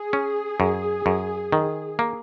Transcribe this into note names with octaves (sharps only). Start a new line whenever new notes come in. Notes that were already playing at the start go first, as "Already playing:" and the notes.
Already playing: G#4
C#4
F#2
F#2
D#3
A#3